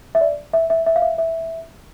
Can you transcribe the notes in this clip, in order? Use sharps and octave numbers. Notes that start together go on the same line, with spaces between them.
E5
D5
E5
E5
E5
F5
E5
E5